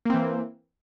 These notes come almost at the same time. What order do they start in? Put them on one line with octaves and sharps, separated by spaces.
A#3 C4 E3